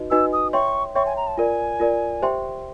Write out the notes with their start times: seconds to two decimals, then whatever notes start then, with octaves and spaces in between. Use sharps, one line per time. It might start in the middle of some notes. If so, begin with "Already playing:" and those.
Already playing: D#4 F#4 B4 D#5
0.11 D#4 F#4 B4 D#5 G#5 E6
0.33 D#6
0.53 C#5 E5 G5 C6 C#6
0.95 C#5 E5 G5 C6 C#6
1.06 G#5
1.17 A#5
1.27 A5
1.37 F4 A#4 D5 G#5
1.80 F4 A#4 D5
2.22 G4 C5 E5 G5 C6